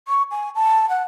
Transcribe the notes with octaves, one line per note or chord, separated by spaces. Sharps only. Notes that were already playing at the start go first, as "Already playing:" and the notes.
C#6
G#5
A5
F#5